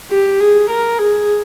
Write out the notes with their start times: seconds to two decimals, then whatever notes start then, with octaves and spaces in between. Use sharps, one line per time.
0.11 G4
0.41 G#4
0.70 A#4
0.99 G#4